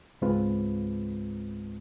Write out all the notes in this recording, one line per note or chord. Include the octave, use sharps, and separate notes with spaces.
C#2 G#2 G#3 C4 F4 B4